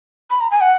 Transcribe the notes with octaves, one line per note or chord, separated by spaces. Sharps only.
B5
A#5
G#5
F#5